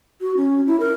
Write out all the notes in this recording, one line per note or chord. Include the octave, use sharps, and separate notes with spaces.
F#4
C#4
E4
A#4